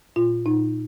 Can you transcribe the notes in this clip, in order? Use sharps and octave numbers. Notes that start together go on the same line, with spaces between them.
A#2 F4
A#2 D#4